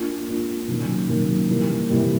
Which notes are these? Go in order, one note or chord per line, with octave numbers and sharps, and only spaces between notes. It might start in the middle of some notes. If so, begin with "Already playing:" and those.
Already playing: A#3 D4 F4
A#3 D4 F4
C3 D#3 F#3 A#3 C#4
C3 D#3 F#3 A#3 C#4
C3 E3 G3 A#3
C3 E3 G3 A#3